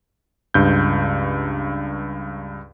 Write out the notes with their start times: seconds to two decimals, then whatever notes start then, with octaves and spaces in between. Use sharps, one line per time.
0.54 C#2 G2 G6